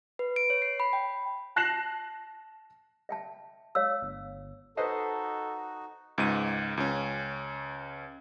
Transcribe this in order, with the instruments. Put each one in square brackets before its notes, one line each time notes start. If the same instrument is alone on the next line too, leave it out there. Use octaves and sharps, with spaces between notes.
[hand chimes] B4
D7
C#5
C7
B5
G5
[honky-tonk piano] A5 F#6 A#6 C7 E7 F#7
[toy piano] E5 G5 A5
C#5 F5 E6
[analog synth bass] G1
[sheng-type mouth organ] D#4 F#4 [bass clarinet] A4 [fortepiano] B4 C5 D#5
[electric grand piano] C#2 G#2 D#7
C#2 C#4